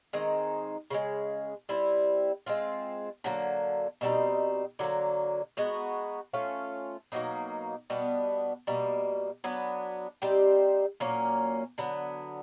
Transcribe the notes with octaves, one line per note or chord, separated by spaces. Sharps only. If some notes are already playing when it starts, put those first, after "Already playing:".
D#3 G#3 C4 D#4
C#3 E3 G#3
G3 C4 E4
G#3 C4 F4
D3 F#3 A#3
B2 G3 C4 D#4
D3 F#3 A#3
G#3 B3 D#4 F#4
A3 C#4 F4
B2 F#3 A#3 D#4
B2 G3 B3 D4
B2 G3 A#3
F#3 B3 D4
G3 C4 D#4 G4
A#2 F#3 A#3 C#4
D3 F#3 B3